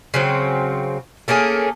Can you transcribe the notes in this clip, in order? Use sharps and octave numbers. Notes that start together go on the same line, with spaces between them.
C#3 F#3 C4
A3 A#3 C#4 G#4